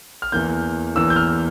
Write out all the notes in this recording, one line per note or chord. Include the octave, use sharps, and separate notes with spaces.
F6
E2 E3 A#3 G6
E2 E3 A#3 E6
G6
F6